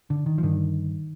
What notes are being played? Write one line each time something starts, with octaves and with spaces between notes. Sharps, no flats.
D3
D#3
F3
G2 D3 D#3